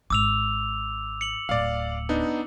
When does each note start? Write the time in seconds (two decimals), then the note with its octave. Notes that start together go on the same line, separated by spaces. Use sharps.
0.10 G#1 D6 E6 F7
1.21 C#7 F#7
1.49 D1 D5 F5
2.09 B3 D4 D#4